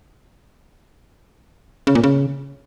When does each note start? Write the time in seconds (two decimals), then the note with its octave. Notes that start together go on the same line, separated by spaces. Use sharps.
1.87 C#3
1.95 A#2
2.04 C#3